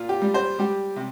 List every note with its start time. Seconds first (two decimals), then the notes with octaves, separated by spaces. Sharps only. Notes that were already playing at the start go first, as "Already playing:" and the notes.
Already playing: A#2 F4
0.09 G4
0.22 G3
0.34 C5
0.59 G3 G4
0.96 C3